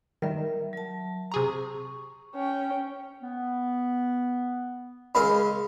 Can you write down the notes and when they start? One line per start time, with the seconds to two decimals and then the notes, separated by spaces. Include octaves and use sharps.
0.22 D#3 G3 A#4 E5
0.73 F#3 A5
1.32 C3 G#4 A#5 C#6
2.35 C#4 G5
3.22 B3
5.15 C#3 G#3 A#4 F5 B5